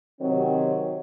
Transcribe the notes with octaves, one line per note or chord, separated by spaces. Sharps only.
C3 D#3 F#3 C4